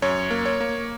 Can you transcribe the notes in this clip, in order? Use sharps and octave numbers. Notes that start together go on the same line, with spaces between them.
F#2 C#5
A#3
C#5
A#3